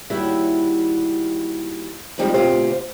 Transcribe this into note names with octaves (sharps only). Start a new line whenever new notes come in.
D#2 G3 E4 F#4 C#5 E5
F3 G3 G#3 C4 D#4
D2 B2 C4 F4 G4 C5